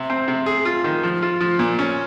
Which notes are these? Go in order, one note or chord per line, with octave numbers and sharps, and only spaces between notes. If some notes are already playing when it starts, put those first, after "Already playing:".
Already playing: C3
C4
C3
G#4
F4
D#3
F3
F4
F3
A#2
C#4